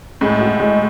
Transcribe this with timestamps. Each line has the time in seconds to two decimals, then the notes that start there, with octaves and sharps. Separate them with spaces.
0.21 A2 G#3
0.41 F#4
0.60 G#3